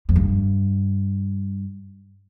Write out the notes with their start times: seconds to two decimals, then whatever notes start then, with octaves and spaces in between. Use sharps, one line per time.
0.09 F2
0.16 G2